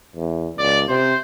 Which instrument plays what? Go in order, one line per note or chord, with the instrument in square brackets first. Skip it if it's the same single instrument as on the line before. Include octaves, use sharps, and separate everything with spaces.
[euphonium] E2
[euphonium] C#2 [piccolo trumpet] D5
[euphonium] C3 [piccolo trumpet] C5